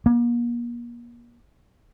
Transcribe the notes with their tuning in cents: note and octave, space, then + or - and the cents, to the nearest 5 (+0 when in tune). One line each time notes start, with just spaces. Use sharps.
A#3 +35